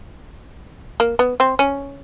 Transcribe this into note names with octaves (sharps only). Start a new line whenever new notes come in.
A#3
B3
C4
C#4